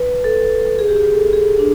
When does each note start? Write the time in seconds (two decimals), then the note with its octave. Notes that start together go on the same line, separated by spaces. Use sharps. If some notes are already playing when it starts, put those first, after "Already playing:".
Already playing: B4
0.24 A4
0.79 G#4
0.88 G4
0.96 G#4
1.14 A4
1.33 G#4
1.59 D4